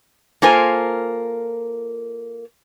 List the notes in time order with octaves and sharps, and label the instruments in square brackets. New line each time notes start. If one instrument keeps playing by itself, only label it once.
[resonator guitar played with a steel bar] A#3 F4 A4 A#4 C5 G#5